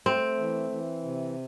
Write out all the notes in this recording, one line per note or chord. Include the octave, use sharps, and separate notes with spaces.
A3 C4
E3
E3
C3